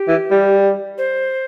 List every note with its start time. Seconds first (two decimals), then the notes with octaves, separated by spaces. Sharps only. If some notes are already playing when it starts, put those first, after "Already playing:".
Already playing: G4
0.08 E3
0.31 G3
0.98 C5